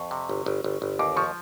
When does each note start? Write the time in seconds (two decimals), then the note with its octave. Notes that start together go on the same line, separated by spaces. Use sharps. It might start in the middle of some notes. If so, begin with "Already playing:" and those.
Already playing: F2 C#6
0.11 C3
0.29 G1
0.46 G1
0.64 G1
0.82 G1
0.99 D#2 D6
1.16 F3 C#6